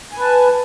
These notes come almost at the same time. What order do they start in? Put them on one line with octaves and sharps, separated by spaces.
G#5 B4 A5